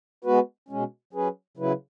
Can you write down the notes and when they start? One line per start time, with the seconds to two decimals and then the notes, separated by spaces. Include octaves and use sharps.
0.24 G#3 B3 F#4 B4
0.68 B2 G#3 C#4
1.13 F#3 C#4 G#4 B4
1.57 C#3 F#3 E4 B4